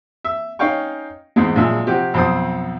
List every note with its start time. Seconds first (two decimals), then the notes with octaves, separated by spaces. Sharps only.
0.25 E5
0.59 C#4 D#4 F5 G5 C#6
1.36 E2 G#2 G#3
1.56 A#1 A#2 F#3 G#3 E5
1.87 C3 F3 F#4 G4
2.14 B1 F2 C4 A5 D#6